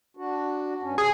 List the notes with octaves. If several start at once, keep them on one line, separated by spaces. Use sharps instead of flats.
D4 F#4
G2 C#4
C3 G#4